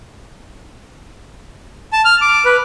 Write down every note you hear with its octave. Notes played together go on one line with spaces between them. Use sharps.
A5
F6
D6
B4